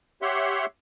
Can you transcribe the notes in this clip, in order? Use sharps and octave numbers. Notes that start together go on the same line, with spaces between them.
G4 C#5 E5 F#5 C6